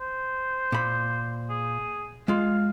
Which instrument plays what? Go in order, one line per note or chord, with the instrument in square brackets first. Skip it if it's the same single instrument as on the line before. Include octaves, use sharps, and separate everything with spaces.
[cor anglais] C5
[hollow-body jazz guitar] A#2 B5
[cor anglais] G#4
[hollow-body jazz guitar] G#3 F4 [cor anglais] F5